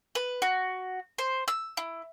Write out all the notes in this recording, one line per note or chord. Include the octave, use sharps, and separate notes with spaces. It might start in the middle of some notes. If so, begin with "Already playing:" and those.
B4
F#4
C5
E6
E4